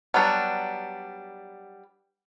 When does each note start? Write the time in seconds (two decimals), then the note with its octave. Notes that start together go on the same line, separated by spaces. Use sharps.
0.14 F#3 G3 B3 D4